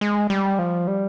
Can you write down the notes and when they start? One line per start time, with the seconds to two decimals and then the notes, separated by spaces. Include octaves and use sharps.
0.01 G#3
0.30 G3
0.59 F3
0.87 G3